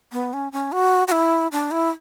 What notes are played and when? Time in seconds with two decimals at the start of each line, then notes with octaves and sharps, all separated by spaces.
0.12 B3
0.33 C#4
0.52 C#4
0.72 F#4
1.08 F#4
1.12 E4
1.52 D4
1.71 E4